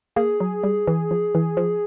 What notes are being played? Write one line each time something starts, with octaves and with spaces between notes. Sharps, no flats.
A#3 G#4
F#3
G3
E3
F3
E3
F3